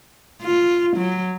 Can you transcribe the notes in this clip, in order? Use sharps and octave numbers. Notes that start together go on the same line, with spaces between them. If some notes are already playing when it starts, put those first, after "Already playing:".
F4
F#3